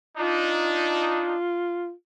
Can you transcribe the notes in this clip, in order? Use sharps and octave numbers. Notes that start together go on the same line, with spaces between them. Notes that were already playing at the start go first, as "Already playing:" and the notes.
D4 D#4 F4